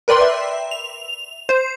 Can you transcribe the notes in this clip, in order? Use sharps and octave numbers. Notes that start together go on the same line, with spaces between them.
A#4 B4 D5 G5 C6
E5
F7
C5